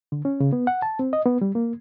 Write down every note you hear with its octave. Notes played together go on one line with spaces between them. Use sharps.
D3
C#4
C#3
B3
F#5
A5
C4
D#5
B3
G3
A#3